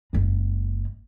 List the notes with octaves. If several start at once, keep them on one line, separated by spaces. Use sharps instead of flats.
F#1 G#3